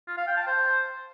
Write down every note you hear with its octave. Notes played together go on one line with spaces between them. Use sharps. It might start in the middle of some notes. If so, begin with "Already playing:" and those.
F4
F5
G5
A5
C5